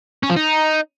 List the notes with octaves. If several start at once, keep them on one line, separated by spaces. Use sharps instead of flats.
C#4
F3
D#4